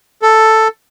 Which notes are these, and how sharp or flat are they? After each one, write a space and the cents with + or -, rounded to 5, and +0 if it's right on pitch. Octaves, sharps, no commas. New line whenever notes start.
A4 +5